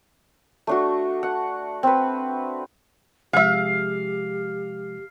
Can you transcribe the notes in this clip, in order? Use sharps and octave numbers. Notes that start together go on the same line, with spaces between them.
A3 D4 F#4
F#5
C4 B4
C3 F3 G#3 G4 G#4 E5 F5